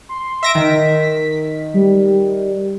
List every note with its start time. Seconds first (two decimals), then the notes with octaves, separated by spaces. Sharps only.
0.09 C6
0.43 E5 A#6 D7
0.55 D#3 B6
1.74 G3